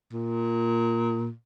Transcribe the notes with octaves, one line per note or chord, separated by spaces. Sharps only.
A#2